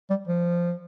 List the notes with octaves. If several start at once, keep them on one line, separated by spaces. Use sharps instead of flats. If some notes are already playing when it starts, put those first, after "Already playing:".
G3
F3